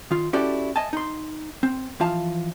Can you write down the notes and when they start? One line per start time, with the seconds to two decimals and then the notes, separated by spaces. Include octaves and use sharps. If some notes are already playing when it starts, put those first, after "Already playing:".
0.11 D#3 F4
0.33 C#4 E4 F#4 G4 A4 D5
0.76 D#5 E5 G#5 A5
0.93 D#4 C6
1.63 C4
2.00 E3 F3 F4 F5 A5